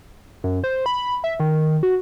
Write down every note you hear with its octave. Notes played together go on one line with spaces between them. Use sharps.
F#2
C5
B5
E5
D#3
F#4